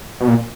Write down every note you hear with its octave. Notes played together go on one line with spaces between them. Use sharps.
B2
A#2